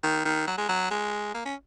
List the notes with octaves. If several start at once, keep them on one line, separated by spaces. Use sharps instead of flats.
D#3
D#3
F#3
G#3
F#3
G#3
A#3
C#4